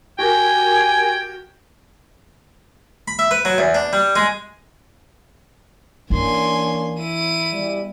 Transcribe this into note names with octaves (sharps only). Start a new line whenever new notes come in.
F#4 G4 A#4 G5 G#5 G#6
B5
E5
B4
F#3
E2
D4
G3
G#3
E3 A#3 C#4 D4 G#5 C6
E4 D#7
B2 E3 G3